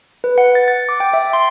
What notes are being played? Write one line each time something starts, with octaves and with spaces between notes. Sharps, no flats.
B4
F#5
A6
A6
D6
G5
E5
C6